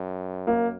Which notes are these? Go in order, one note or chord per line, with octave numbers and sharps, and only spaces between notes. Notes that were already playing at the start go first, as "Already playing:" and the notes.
Already playing: F#2
A#3